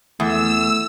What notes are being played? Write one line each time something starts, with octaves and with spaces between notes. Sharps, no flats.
E2 A3 E6